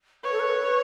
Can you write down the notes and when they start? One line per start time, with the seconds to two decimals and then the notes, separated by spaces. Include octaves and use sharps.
0.24 B4 C#5
0.32 A4
0.39 B4